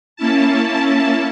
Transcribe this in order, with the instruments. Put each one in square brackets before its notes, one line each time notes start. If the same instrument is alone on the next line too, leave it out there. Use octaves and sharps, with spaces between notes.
[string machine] A#3 C#4 E4 A5